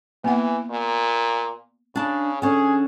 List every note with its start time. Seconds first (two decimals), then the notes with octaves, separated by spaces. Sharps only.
0.24 E3 A#3 B3 F#5
0.71 A#2
1.96 C#3 D4 A5
2.42 D3 C#4 G#4